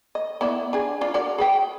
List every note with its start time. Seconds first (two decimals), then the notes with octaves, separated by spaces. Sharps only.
0.15 D#5
0.41 B3 E4 D5
0.73 D4 G#4
1.01 D4 F4
1.14 F#4 A#4 D5
1.38 G#4 B4 G5